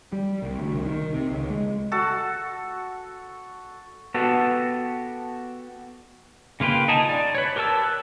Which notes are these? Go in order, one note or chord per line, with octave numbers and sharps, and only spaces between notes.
G3
C2
D2
C2
D#3
C3
C#2
G#3
F#4 A4
B3 F#4 G4 A4
C#3 A#3 F4 B4 G5
D#4 G#4 A5
D5
B4 C#5
G4 A#4 C#5 A5 E6
F#6